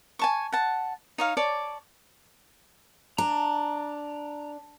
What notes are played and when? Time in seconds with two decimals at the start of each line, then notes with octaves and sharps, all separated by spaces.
0.19 G#5 A5 C#6
0.52 F#5 A5
1.18 D#4 C#5 F5
1.37 C#5 D5 A5 D6
3.18 D4 A#5